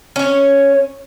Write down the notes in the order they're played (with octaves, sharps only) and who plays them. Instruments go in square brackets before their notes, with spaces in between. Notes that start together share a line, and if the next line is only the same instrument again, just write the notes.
[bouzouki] C#4 C#5